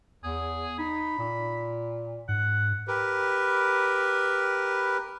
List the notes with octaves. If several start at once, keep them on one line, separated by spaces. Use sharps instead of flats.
E2 G#4
D#4 B5
A#2
G#2 F#5
G4 A#4 B4